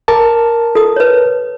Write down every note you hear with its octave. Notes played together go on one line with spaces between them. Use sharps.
A#4 A5 D6
A4 D#6
B4 C#5